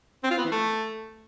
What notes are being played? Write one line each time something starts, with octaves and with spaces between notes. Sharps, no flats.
C4
F4
B3
E3
A3